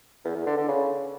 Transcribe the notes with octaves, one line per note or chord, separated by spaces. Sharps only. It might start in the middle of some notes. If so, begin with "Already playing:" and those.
E2
E2
D3
D3
C#3